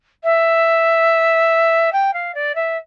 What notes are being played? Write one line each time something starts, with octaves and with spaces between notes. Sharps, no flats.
E5
G5
F5
D5
E5